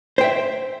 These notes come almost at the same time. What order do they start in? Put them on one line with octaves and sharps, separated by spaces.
C5 G5 E5